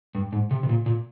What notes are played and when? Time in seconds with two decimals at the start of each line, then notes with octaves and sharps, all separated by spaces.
0.15 G2
0.32 G#2
0.51 C3
0.63 C3
0.69 A#2
0.86 A#2